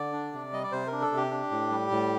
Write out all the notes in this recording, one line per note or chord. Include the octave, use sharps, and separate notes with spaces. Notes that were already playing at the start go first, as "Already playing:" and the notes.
Already playing: D3 D5
D4
C3
G3 D#5
D5
C3 C5
A#4
D4
A4
C3
G4
D4
A2
G3
A2